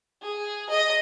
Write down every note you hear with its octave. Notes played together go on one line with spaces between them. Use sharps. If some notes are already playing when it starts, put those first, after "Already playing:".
G#4
D#5